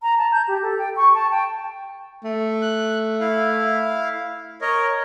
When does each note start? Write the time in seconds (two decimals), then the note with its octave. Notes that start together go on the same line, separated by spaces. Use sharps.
0.03 A#5
0.18 A5
0.32 G6
0.48 G4
0.63 A4
0.79 G5
0.97 C#6
1.15 A5
1.31 G5
2.24 A3
2.62 F#6
3.20 E4 F5
4.61 A#4 C#5 D#5